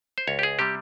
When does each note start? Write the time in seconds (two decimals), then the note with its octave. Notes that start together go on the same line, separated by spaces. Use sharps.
0.18 C5
0.27 C#2 C#5
0.39 G4
0.43 G#4
0.59 C3 G3 G4